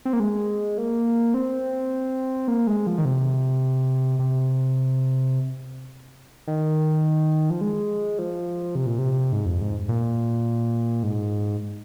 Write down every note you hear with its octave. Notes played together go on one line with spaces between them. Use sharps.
C4
A#3
G#3
A#3
C4
A#3
G#3
F3
D#3
C3
C3
D#3
F3
G#3
F3
C3
A#2
C3
G#2
F2
G#2
A#2
G#2